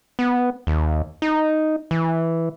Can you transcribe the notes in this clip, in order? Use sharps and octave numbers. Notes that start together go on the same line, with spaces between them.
B3
D#2
D#4
E3